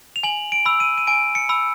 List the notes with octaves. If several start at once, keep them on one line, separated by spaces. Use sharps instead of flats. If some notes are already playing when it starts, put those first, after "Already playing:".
F7
G#5 F#7
D7
B5 E6
D#7
D#7
G#5 D7
C#7
B5 E6